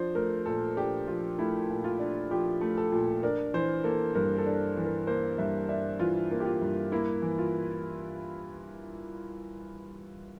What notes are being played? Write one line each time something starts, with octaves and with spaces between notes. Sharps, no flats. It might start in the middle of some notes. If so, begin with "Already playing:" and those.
Already playing: F3 D4 C5
A3 A#4
A#2 A4
D4 G4
F3 F4
A3 E4
A#2
F4
D4
F3 G4
A3
A4
A#2
D4 A#4
E3 C5
A#3 A4
G2 A#4
A4
D4
E3
A#4
A#3 C5
G2 E5
D4 E5
E3 F4
A#3
G4
F4
G2
A#3 E4
E3
F4